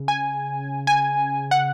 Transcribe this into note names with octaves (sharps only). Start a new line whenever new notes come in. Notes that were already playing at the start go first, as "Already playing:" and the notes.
Already playing: C#3
G#5
G#5
F#5